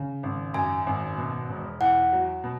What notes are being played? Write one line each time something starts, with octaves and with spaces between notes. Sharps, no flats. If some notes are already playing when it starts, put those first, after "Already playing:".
Already playing: C#3
G#1
F#2 G#5
G#1
B2
E1
E2 F#5
F#3
B2